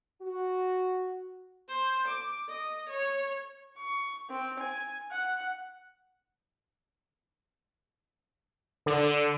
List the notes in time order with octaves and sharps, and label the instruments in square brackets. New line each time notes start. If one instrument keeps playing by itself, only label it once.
[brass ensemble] F#4
[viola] C5
D6
D#5
C#5
[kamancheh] C#6
C4
G#5
F#5
[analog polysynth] D3